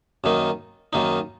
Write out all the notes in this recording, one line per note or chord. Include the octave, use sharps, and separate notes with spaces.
F#2 D#3 A#3 D#4
F#2 D#3 A#3 D#4